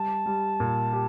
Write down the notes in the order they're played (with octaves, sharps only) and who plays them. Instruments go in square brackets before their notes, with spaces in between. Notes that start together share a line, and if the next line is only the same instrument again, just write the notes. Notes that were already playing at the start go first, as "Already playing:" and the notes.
Already playing: [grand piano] G3 [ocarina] A5
[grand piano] G3
A#2
G4